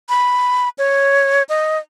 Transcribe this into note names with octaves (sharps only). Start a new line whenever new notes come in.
B5
C#5
D#5